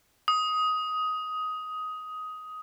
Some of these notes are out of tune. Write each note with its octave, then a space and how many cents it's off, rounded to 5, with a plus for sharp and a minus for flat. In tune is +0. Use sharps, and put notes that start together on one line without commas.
D#6 +15